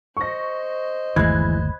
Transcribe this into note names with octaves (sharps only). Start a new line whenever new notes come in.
C5 D#5 C#6 A#6
G1 D#2 E3 G#3 A3 B5 F#6 G#6